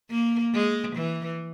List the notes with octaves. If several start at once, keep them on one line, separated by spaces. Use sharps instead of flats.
A#3
G#3
E3